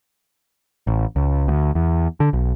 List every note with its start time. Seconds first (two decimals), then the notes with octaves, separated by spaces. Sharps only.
0.87 A1
1.16 C#2
1.48 D2
1.75 E2
2.20 D3
2.33 B1